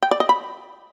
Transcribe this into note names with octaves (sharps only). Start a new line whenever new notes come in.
G5
D5
D#5
B5